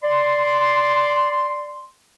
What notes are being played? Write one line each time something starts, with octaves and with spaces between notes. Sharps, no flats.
D5 C6